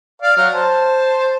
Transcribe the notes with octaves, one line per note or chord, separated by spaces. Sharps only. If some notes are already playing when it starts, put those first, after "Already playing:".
D5 F5
F#3 F6
C5 A5